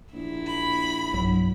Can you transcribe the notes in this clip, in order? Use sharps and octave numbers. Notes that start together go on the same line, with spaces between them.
A#1 E4
B5
B1 G2 F#3